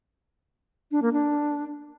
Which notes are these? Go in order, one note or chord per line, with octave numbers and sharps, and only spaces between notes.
D4
A#3
D4